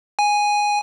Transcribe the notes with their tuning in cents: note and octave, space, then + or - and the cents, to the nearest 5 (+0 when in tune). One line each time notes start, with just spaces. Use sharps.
G#5 -5